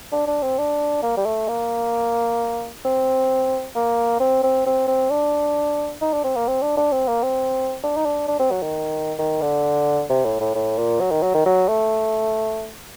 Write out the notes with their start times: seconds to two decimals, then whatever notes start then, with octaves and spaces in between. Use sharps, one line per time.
0.12 D4
0.27 D4
0.43 C4
0.58 D4
1.03 A#3
1.17 G3
1.26 A3
1.48 A#3
2.85 C4
3.75 A#3
4.20 C4
4.43 C4
4.66 C4
4.88 C4
5.11 D4
6.01 D#4
6.13 D4
6.24 C4
6.36 A#3
6.48 C4
6.62 D4
6.77 D4
6.92 C4
7.07 A#3
7.23 C4
7.83 D4
7.97 D#4
8.05 D4
8.28 D4
8.39 C4
8.51 F#3
8.62 D#3
9.19 D#3
9.41 D3
10.10 C3
10.25 A2
10.40 A2
10.55 A2
10.78 A#2
11.00 F#3
11.11 D#3
11.23 F#3
11.34 D#3
11.46 F#3
11.68 A3